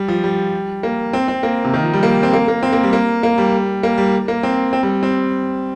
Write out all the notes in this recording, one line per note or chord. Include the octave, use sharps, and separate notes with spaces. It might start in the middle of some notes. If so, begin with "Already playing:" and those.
Already playing: G3
F3
G3
A#3
C4
C4
A#3
C3
D#3
F3
G3
A#3
C4
A#3
A#3
C4
A#3
G3
A#3
A#3
G3
A#3
G3
A#3
C4
C4
G3
C4